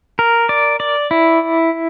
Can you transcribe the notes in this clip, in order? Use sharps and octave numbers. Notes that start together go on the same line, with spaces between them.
A#4
D5
D5
E4